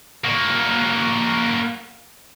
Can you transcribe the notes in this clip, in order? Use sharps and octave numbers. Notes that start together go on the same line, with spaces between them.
A#3 F#4